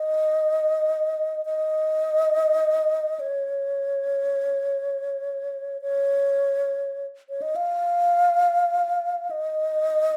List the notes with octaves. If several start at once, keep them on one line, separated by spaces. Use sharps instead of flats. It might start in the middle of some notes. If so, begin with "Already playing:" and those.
Already playing: D#5
D#5
C#5
C#5
C#5
D#5
F5
D#5